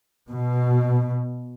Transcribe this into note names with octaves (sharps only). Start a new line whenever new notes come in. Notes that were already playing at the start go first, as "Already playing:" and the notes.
B2